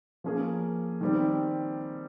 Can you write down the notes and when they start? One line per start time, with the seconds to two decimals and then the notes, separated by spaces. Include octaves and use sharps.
0.24 F3 A#3 C#4 G#4
1.01 D#3 G3 C4